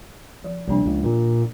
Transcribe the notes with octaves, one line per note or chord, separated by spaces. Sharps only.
F3
C2 F3 A#3 D4
C#2
A#2